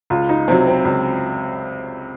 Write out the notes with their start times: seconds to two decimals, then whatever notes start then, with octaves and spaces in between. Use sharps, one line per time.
0.10 C#2 F4
0.29 D#4
0.48 C3 F#3 C4
0.67 C4
0.85 C#2